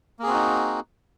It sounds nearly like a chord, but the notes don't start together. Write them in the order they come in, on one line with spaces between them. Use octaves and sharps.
A#3 G#4 C4 F#4 D#4